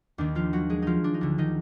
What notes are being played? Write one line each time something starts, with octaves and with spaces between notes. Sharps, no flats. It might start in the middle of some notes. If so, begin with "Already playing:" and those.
D#2 D#3 D4
F3 F4
F#3 F#4
G#3 G#4
F3 D#4 F4
D4
D#4
D2 D3 D4
D#3 D#4